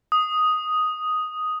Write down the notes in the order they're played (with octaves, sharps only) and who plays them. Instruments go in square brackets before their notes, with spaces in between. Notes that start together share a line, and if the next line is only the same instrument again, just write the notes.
[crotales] D#6